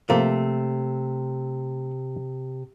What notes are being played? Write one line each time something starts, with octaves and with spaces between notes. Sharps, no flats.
C3 F3 A3 A#3